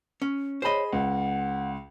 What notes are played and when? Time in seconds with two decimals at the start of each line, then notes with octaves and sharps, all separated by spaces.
0.22 C#4
0.62 G#4 C5 C#5 D#5 B5
0.93 C#2 F#5